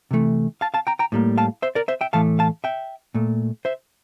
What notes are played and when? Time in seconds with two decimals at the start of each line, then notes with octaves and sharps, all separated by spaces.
0.11 C3 E3 A3
0.61 F5 A5
0.74 F5 A5
0.87 G5 A#5
0.99 G5 A#5
1.12 A2 G3 A#3
1.38 F5 A5
1.62 C5 E5
1.75 A#4 D5
1.88 C5 E5
2.01 E5 G5
2.13 A2 E3 A3 F5 A5
2.39 F5 A5
2.64 E5 G5
3.14 A#2 A3
3.65 C5 E5